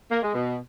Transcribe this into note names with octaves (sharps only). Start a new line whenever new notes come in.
A#3
G#3
B2